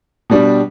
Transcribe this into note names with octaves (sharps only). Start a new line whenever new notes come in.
B2 G3 D4